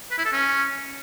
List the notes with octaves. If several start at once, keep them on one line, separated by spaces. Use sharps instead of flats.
B4
E4
A4
C#4